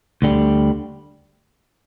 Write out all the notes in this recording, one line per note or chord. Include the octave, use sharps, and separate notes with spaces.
D2 D3 G3